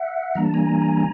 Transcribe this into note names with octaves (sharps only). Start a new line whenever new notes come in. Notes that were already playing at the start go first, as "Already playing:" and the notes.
Already playing: E5 F#5
E3 G3 A#3 D4 A#5
A5
G#5 A#5